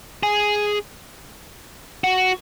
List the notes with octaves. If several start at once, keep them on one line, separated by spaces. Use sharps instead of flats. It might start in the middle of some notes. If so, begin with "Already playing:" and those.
G#4
F#4